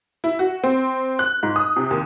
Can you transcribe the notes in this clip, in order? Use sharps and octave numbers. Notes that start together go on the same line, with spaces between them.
E4
F#4
C4
F#6
G#2
D#6
C3
D#2